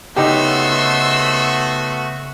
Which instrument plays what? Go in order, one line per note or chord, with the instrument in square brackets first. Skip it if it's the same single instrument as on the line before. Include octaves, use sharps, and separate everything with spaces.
[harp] C#3 [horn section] A3 B3 F#4 [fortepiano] D#4 G4 [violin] C6 E6